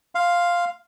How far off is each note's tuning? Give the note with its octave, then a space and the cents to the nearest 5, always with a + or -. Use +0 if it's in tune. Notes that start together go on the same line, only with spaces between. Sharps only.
F5 +0 C6 +0